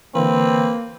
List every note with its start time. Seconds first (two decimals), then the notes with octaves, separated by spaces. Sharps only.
0.15 D3 E3 A#3 C4 B4